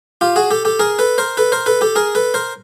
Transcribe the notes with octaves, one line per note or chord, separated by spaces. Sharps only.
F4 G4
F#4 G#4
G4 A4
G4 A4
G#4 A#4
A4 B4
A#4 C5
A4 B4
A#4 C5
A4 B4
G4 A4
G#4 A#4
A4 B4
A#4 C5